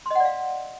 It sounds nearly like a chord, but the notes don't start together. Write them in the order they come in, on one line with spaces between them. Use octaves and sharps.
C6 D#5 F#5 D5 F5